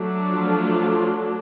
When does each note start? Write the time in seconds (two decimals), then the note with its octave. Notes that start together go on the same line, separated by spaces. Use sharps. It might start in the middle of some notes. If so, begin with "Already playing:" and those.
Already playing: F#3 A3 D4
0.32 F3 F4